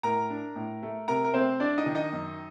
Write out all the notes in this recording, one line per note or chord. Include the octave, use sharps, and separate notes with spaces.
A2 A#4 A#5
D4
A2
A3
C3 A#4 A#5
A#4
A3 C4 C5
D4 D5
D#4 D#5
D#3
D#4 D#5
F#2